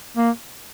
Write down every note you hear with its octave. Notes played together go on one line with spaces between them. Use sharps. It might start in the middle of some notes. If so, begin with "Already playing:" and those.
A#3